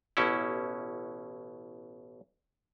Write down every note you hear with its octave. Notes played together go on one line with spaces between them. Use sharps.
A1 B2 C#4 E4